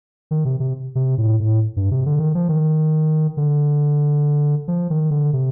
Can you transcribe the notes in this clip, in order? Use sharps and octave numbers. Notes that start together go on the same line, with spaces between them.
D#3
C3
C3
C3
A2
A2
G2
C3
D3
D#3
F3
D#3
D3
F3
D#3
D3
C3